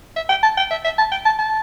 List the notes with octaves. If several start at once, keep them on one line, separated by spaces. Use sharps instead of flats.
E5
G5
A5
G5
E5
E5
A5
G5
A5
A5